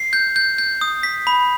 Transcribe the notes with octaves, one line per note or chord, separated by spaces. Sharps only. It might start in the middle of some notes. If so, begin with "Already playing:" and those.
Already playing: C7
G6
G6
G6
D#6
B6
B5